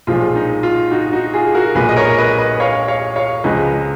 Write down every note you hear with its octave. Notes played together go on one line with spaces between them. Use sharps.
B1 A#2 F3 G#3 F4
D#4
F4
D#4 F#4
D#4 F#4
F4 G#4
F#4 A#4
B1 A#2 G#3 G#4 B4
D#5
A#4 C#5
B4 D#5
B4 D#5
C#5 F5
C#5 F5
C#5 F5
C#2 C#3 F3 G#3 B4 D#5